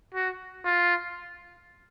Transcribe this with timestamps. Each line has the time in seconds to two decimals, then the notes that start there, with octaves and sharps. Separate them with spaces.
0.14 F#4
0.64 F4